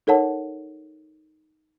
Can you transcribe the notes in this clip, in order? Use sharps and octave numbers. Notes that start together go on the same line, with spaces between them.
D#4 A4 A#4 C#5 F#5 A5